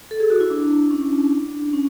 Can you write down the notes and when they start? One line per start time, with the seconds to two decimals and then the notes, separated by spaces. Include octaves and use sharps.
0.11 A4
0.20 G#4
0.30 F#4
0.40 E4
0.50 D4
0.91 C#4
1.11 D4
1.73 C#4